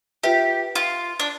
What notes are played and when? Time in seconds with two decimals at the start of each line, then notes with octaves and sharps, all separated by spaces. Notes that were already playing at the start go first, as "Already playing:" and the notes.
0.23 F4 G4 B4 E5
0.75 F4
1.20 D4